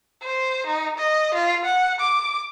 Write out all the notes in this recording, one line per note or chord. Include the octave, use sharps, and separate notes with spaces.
C5
D#4
D#5
F4
F#5
D6